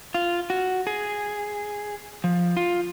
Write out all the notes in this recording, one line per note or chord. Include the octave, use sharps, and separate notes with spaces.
F4
F#4
G#4
F3
F4